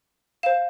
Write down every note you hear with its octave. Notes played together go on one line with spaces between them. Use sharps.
C5 F5 E7